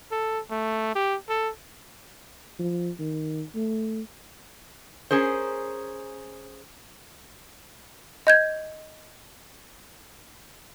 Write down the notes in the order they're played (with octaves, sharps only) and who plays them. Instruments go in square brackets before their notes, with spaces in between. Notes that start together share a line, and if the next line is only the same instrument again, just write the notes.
[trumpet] A4
A3
G4
A4
[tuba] F3
D#3
A3
[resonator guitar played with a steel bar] C#4 G#4 A#4 C5
[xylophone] D#5 G6 G#6